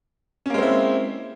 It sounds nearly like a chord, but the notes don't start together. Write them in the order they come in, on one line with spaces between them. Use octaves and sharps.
C#4 A#3 G#3 C4 E4